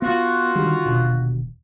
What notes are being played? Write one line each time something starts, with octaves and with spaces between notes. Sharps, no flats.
B3 F4 F#4
D3 D#3 G3
D#1 B2 D3